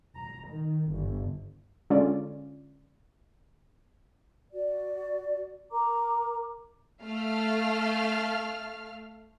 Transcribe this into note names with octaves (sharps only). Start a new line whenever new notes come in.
A#5
D#3
G1
D3 G#3 C#4 F4 D5
F#4 D5
A#4 A#5 D6
A3 F5 F6